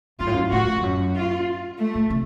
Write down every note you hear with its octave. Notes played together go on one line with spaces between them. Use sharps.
F#2 F4
A2
F#2
A2 F#4
F2
F#2
F4
A3
A#2
C3